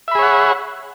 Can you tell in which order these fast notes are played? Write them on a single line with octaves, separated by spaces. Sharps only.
E5 B5 G#4 C#5 F#5